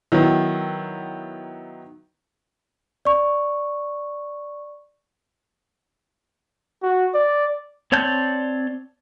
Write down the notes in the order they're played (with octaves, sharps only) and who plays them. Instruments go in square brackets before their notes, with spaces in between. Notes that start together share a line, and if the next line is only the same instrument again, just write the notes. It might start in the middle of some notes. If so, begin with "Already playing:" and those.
[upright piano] D#3 F#3 B3 D#4 E4
[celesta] D5 C#6
[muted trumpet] F#4
D5
[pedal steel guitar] C4 C#5 D5 A5 G6